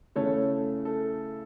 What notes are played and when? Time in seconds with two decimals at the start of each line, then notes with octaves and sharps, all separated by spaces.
0.16 C#3 A3 E4 A4 C#5
0.85 A4